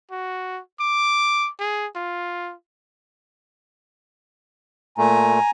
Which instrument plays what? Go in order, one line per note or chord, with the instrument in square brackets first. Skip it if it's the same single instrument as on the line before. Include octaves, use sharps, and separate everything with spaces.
[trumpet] F#4
D6
G#4
F4
[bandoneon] A#2 A3 [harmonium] G#5 A#5